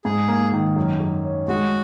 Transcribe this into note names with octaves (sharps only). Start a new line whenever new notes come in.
G#2 G#4
A#3
D#3
F#2
F#2
C#4
G#3 F#4